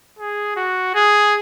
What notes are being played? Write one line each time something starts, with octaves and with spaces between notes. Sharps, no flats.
G#4
F#4
G#4